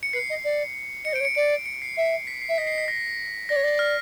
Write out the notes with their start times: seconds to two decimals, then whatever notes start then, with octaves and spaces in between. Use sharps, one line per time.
0.03 C#7
0.13 B4 C7
0.30 D#5
0.44 D5
1.05 D#5 C#7
1.13 C5
1.16 C#5 D7
1.25 C#7
1.35 D5 D7
1.66 C#7
1.82 C7
1.96 E5 C7
2.27 B6
2.42 C7
2.49 E5
2.58 D#5 B6
2.67 C7
2.78 B6
2.88 A#6
3.49 D5 A#6
3.56 C#5
3.63 D5 A#6
3.79 F6